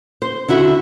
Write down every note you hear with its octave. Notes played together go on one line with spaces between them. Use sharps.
C5
D3 E4 F#4 E5